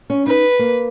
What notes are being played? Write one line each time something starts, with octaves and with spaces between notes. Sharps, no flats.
C#4
D#4 B4
A#3